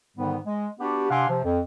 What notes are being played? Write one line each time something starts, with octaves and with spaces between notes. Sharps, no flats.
G#2 D3 D#3 G3 B3
G#3
B3 D4 F#4 G4
C3 D4 F5 F#5 G#5 C6
C3 F3
F2